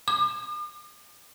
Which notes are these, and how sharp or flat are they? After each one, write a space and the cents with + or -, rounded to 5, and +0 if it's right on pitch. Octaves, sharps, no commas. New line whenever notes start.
D6 +45